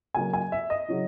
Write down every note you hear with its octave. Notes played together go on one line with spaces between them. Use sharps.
C#3 F#3 A#3 G#5
G#5
E5
D#5
C#3 F#3 C#4 E4